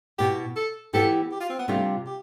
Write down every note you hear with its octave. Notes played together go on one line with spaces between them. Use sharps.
B2 B3 E4 G4
A4
E3 B3 E4 G4 A4
G4
F4
C4
B3
C3 G3 A3 D4 F4
G4